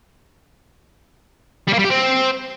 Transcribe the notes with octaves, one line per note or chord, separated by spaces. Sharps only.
G3
A#3
G3
G4
C4